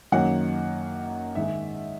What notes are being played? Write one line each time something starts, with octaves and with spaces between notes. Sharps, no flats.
F#2 D#3 F#3 A#3 F#5
G#2 D#3 G#3 E5